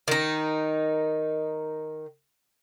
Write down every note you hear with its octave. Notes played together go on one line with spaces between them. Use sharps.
D#3 D#4